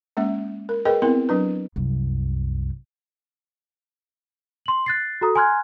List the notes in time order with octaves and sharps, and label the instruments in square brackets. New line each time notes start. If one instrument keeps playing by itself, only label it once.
[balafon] G#3 A#3 C#4 E5
A#4
G#4 A#4 B4 D#5 G5
B3 C4 E4 A#4
F#3 D4 B4
[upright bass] C2 F#2
[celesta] C6 F#7
F#6 A6 C7
F#4 A4 A#5 D#6
G#5 A#5 C6 F6 F#6 G#6